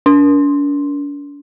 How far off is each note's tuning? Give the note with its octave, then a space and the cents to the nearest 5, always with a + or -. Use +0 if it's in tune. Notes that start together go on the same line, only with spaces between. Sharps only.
D4 -40